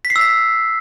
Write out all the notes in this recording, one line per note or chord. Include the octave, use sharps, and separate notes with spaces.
B6
C7
E6
B6